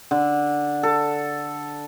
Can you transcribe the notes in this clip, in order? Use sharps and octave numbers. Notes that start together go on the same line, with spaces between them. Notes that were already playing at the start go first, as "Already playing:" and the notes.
D3
A4